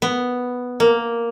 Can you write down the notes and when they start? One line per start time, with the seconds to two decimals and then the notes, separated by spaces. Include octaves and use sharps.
0.02 B3
0.80 A#3